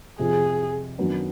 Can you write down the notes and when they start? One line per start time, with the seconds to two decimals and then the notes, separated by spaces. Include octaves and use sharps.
0.19 F2 C3 F3 G#4
0.98 F#2 D#3 F#3 B3 D4